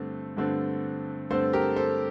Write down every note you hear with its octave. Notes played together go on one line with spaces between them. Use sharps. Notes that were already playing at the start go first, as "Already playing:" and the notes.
Already playing: G2 D3 A3 C4
G2 D3 A3 C4
G2 D3 A3 C4 A4 C5
G4 A#4
A4 C5